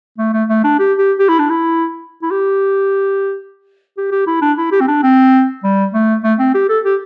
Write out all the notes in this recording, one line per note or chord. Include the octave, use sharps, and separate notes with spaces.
A3
A3
A3
D4
G4
G4
G4
E4
D4
E4
E4
G4
G4
G4
E4
D4
E4
G4
C4
D4
C4
G3
A3
A3
C4
G4
A4
G4